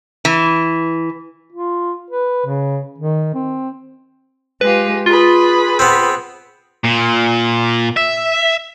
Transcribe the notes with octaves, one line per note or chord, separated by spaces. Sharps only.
E3
F4
B4
C#3
D#3
C4
G#3 F4 G4 B4
F4 G#4 B4 B5
B3 C4
A#2
E5